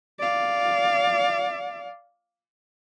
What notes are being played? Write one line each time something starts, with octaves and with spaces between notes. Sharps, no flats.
D5 F5